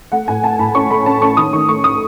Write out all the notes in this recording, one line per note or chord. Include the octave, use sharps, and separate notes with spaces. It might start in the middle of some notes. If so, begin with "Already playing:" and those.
A3 F#5
A2 G#5
A3 A5
A2 B5
C#4 C#6
A3 B5
C#4 A5
C#4 C#6
D#3 D#6
D#3 C#6
A3 C#6
D#6